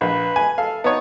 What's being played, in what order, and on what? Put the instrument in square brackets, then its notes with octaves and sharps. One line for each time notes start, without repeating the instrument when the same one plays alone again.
[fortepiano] A#1 [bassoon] B4
[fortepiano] G#5
[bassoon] A4 [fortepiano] F5
[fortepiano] B3 C#5 [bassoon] D#4